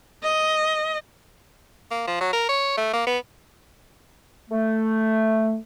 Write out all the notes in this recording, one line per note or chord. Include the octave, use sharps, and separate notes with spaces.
D#5
A#3
F3
F#3
A#4
C#5
A3
A#3
B3
A3